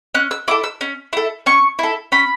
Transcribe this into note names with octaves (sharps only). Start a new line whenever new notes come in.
C#4 F#6
E6
E4 A4 D6
E6
C#4
E4 A4
C#4 C#6
E4 A4
C#4 B5